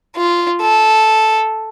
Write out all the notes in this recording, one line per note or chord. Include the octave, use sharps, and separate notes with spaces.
F4
A4